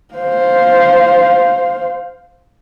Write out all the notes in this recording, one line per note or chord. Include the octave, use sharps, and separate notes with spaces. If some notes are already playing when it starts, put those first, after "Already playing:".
C5 F5